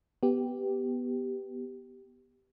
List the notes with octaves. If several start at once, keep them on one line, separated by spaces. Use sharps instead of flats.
B3 G4